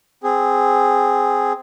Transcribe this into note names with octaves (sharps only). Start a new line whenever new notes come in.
C4 G#4